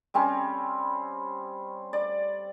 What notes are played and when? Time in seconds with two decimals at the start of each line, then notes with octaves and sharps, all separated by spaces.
0.14 G3 C4 C#4
1.93 D5